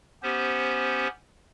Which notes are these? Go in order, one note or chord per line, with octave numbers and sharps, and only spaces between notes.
B3 C#4 G4 C5